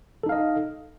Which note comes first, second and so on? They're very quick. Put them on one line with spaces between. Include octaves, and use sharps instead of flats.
A4 D#4 F5 D#5